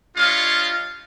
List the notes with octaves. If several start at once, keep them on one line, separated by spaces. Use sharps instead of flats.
G3 D4 F4 C#5 D#5 F5